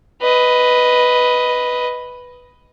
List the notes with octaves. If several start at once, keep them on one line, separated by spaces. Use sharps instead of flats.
B4 D#5